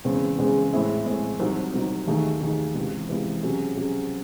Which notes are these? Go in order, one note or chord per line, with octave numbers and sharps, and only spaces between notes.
E2 C#3 G#3 C4
E2 C#3 G#3 C4
A2 G#3 C4 E4 G#4
A2 G#3 C4 E4 G#4
C2 C3 F#3 C4 D#4
C2 C3 F#3 C4 D#4
D#2 D#3 A3 D#4 G#4
D#2 D#3 A3 D#4 G#4
C#2 C3 E3
C#2 C3 E3
C3 F#3 C#4 G#4
C3 F#3 C#4 G#4